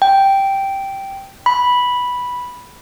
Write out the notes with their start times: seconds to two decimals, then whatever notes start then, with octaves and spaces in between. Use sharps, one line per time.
0.02 G5
1.46 B5